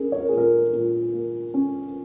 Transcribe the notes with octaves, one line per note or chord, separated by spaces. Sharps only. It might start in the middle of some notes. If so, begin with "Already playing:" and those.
Already playing: C#4 G#4 A#4
C#5
A#4
A#2 G#4
A#4
A#2
A#3
C#4